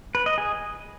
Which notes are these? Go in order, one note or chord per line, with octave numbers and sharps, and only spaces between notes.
B4
D#5
G#4